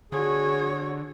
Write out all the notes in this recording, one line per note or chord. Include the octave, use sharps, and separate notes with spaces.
D3 F#4 G#4 C#5